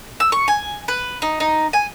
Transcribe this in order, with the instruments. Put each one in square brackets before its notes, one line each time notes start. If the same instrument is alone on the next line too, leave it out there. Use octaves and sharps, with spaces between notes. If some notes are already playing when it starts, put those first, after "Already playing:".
[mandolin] E6
C#6
G#5
B4
D#4
D#4
G#5